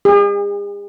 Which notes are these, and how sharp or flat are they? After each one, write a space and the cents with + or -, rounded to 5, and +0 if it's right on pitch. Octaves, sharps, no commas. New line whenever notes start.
G#4 -45